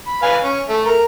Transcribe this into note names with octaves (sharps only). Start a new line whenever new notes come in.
B5
B4 F5 G#5
C#4
A3
A#4